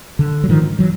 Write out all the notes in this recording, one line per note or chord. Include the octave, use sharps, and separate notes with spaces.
D3
F#3
G#2 D#3 F3
E3 F#3